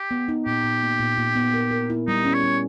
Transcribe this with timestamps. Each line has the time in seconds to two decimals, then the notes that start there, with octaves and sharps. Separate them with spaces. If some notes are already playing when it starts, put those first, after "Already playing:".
Already playing: G4
0.11 B3
0.28 D#4
0.46 A#2 G4
0.64 A#2
0.82 A#3
1.00 A#2
1.17 A#2
1.36 B3
1.54 A#4
1.71 A#4
1.90 E4
2.08 G3 D#4
2.25 C#4
2.34 C#5
2.43 G3